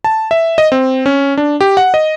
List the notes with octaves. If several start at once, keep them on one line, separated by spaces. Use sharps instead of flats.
A5
E5
D#5
C4
C#4
D4
G4
F#5
D#5